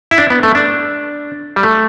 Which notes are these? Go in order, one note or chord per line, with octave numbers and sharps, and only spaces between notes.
E4
D4
B3
A3
D4
G3
A3